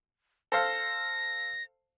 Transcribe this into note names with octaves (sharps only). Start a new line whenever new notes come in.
A4 C5 F5 A#6